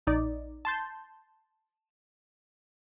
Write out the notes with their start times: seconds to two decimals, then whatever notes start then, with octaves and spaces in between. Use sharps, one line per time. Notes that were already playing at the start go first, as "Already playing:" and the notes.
0.07 A#1 D#4 D5
0.65 A5 C6 G6